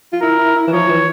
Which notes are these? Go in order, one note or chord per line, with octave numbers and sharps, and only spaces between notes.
F4
E4 A#4
E4
E4
E3
F3 C#5
E3